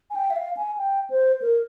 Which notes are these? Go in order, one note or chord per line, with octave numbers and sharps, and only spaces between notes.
G#5
G5
E5
F5
G#5
G5
C5
A#4